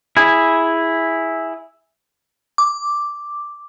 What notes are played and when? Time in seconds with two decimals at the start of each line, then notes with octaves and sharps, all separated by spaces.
0.17 E4 G#4
2.58 D6